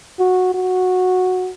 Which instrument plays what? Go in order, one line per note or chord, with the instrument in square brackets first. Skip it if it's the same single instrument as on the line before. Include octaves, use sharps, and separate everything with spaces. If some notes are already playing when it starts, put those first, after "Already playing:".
[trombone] F#4
F#4